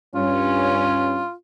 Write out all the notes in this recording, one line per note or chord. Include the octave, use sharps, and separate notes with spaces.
G2 C#4 F4